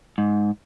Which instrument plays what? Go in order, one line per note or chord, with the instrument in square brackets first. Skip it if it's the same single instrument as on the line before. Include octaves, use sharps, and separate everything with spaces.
[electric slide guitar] G#2